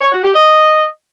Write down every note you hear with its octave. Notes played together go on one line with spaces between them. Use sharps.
C#5
F#4
G4
D#5